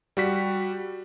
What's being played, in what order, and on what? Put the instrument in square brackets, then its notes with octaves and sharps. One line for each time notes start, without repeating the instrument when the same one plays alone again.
[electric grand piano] G3 F#4 B6